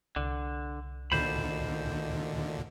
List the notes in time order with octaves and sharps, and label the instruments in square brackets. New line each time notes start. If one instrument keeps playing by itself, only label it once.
[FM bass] C2 [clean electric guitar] D3
[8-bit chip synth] D2 A#2 D3 [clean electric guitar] D#3 C5 B5